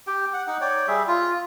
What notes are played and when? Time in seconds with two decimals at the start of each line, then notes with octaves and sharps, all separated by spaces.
0.07 G4 G5
0.33 F#5
0.47 D#4 F#5
0.61 C#5 D5 G5
0.88 G3 G#4 E5
1.08 F4